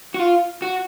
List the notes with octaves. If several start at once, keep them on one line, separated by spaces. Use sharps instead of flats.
F#4
F4
F#4